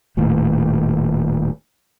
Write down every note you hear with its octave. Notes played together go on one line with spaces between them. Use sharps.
D#1 D#2 A2